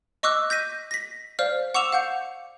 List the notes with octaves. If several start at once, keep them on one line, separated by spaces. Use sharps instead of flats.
D#5 C#6 D6 E6 F#6
G6 A#6 B6 D#7
A#6 B6
C5 D5 F5 F6
F#5 C#6 D6 E6 E7 F7
F5 F#5 G6 C#7